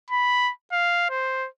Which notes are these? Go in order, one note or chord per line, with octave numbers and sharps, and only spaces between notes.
B5
F5
C5